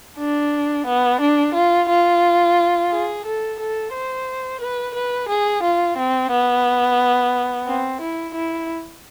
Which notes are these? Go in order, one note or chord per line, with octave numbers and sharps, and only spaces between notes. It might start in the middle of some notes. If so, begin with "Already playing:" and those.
D4
B3
D4
F4
F4
G#4
A4
A4
C5
B4
B4
G#4
F4
C4
B3
C4
E4
E4